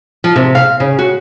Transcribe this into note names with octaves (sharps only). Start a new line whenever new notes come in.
F3
C3
F5
C#3
F#4